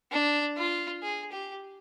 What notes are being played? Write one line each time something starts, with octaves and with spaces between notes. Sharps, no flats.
D4
F4
G#4
G4